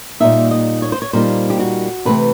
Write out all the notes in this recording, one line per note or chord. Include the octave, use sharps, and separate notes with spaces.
A#2 G3 A#3 D#4 E5
D#5
C#5
C5
C#5
A#2 G3 A#3 D#4 C5
G4
F#4
C3 E3 A3 C4 B4